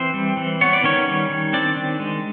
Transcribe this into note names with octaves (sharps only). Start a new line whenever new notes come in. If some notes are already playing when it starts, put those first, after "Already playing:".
Already playing: E3 C4 C5
G3
E3
B3 C#5
D5
D#3 C#4 C#5
G3
D#3
C4 D4 D5
D#3
G#3